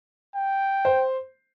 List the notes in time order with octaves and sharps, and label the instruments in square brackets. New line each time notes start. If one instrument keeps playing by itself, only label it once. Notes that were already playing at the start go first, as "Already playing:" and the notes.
[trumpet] G5
[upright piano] C5